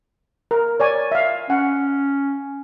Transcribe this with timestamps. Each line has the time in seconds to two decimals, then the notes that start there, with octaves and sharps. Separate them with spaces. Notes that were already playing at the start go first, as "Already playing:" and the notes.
0.51 A#4
0.80 C#5 D5 G#5
1.12 E5 F5
1.50 C#4 F#5